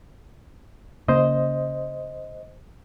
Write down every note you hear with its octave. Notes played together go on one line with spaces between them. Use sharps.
C#3 A#3 C5 D#5